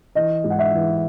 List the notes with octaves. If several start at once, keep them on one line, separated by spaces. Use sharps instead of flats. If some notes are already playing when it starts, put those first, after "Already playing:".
E3 D#5
G#2
F#5
E5
E3